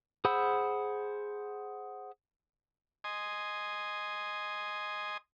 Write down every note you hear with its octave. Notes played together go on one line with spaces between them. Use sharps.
G#4 C5 F#5 B5 E6
D#5 G#5 C6 D#6